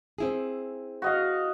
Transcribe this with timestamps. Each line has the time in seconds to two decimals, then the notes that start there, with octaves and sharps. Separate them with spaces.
0.18 C4 E4 G#4
1.02 F#4 D#5 F5